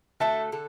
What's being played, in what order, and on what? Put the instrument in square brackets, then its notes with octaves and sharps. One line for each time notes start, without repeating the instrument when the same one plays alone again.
[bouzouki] D3 A3 F#4 A4 [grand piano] E5 A5
[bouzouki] D3 A4